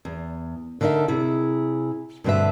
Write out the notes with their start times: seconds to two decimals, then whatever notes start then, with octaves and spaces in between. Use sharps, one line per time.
0.05 E2
0.81 D3 D#4 A#4 C#5 E5
1.08 C3 E4 G#4
2.24 G2 B2 D3 C4 B4 E5